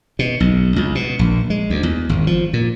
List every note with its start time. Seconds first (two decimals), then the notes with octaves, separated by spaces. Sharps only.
0.19 B2
0.40 B1
0.76 C#2
0.95 B2
1.19 A#1
1.50 G#3
1.70 D2
1.83 E2
2.09 G#1
2.27 F3
2.53 A#2